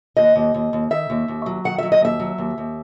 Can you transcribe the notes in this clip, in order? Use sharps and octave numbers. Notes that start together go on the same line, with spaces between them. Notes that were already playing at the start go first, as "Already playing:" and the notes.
D#2 D#5
D#2
D#2
D#2
D#3 E5
D#2
D#2
F#3
D#3 F#5
F#3 E5
D#5
D#2 E5
F#3
D#2
D#2